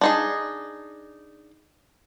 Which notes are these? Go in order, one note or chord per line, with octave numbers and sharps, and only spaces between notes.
D4 D#4 G#4